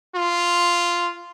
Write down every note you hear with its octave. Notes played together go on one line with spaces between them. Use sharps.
F4